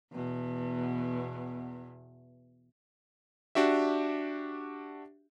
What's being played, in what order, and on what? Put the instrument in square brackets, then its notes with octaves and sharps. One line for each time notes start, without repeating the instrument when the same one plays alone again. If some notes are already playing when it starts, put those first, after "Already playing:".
[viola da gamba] E2 B2
[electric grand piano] D4 F#4 G4 E5